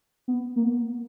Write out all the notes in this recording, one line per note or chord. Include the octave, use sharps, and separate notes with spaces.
B3
A#3
B3